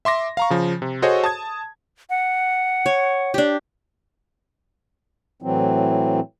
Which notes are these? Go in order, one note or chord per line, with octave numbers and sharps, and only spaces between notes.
E5 C6 D6 A#6
F5 A#5 C#6
C#3 F3
C3
F#4 G#4 A4 C5 C#5 D#5
A5 D#6 G#6
F#5
C#5
D4 G4
A2 E3 F#3 C4